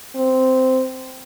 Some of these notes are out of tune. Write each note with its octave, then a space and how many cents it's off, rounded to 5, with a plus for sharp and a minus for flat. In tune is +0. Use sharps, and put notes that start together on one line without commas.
C4 -10